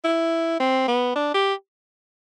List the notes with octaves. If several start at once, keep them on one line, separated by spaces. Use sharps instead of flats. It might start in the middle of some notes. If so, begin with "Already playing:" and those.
E4
C4
B3
D4
G4